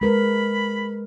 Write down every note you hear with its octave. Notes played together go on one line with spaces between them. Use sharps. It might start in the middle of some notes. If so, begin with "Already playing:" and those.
G#3 A#4 B4 B5